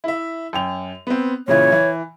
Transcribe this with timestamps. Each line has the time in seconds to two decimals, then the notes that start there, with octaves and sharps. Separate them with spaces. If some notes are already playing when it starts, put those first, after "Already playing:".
0.04 E4 E5
0.53 F#2 G5 F7
1.07 B3 C4
1.48 A#2 C#3 E3 C#5
1.72 E3